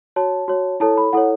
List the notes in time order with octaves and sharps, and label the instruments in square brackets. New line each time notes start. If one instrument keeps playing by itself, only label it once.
[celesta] F#4 C#5 A5
F#4 C#5
E4 A4 C#5 A5
B5
E4 A4 C#5 F#5